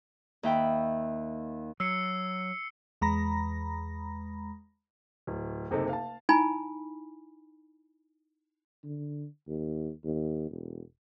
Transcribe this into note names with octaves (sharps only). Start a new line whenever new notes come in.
D#2 E5 G5 B5
F#3 E6 C7 C#7
E2 G#3 A#5 B5 A#6
D1
F#1 C3 D#4 A4
F5 A5
D#4 E4 G#5 B5
D3
D#2
D#2
E1